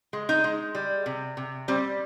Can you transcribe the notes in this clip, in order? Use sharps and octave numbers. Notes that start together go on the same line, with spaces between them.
G#3
D#4
G#3
G3
C3
C3
G3 C4